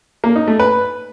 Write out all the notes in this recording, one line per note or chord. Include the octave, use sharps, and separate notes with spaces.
A#3
D#4
A3
B4